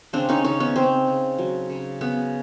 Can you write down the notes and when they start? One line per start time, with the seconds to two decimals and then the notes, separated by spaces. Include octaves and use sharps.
0.13 C#3 C4 D4
0.29 C#4 D#4
0.44 C#3 C#4 D#4
0.60 B3 C#4
0.76 C#3 C4
1.07 C#3
1.39 F#3
1.70 C#3
2.01 C#3 B3